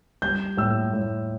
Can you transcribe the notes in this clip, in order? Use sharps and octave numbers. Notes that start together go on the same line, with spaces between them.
G3 G6
A2 E6
A2